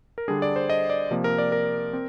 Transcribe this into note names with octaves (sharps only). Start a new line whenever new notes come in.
A#4
D3 G3 D4 G#4
D5
C5
D#5
D5
C3 F3 A#3
A#4
D5
A#4
C4